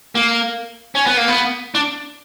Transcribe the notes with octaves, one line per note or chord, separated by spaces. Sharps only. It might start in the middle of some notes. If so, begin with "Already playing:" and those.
A#3
C#4
B3
A#3
B3
D4